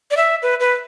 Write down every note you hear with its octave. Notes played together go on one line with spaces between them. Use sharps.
D5
E5
B4
B4